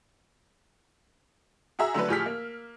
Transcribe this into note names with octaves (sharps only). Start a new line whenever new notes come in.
F#4 G#4 E5 A#5 E6
D3 F#3 A3 B4
A2 F3 G4 G#4 F6 B6
A#3